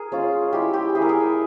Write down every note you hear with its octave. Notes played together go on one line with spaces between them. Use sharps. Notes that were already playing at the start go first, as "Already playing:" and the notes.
Already playing: G#4 A#4
G#3 C#4 F4
G#3 E4 G4
G4
G#3 E4 G#4
A#4
G#4